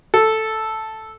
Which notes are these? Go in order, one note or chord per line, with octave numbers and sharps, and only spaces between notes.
A4